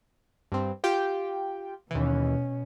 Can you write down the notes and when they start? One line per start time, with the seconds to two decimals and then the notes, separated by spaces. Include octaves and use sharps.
0.52 G2 C4
0.84 F4 G4 G5
1.91 D#2 B2 E3 C#4